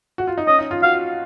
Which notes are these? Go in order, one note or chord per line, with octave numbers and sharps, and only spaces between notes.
F#4
F4
D#4
C#4 D#5
D#4
F4
F#4 F5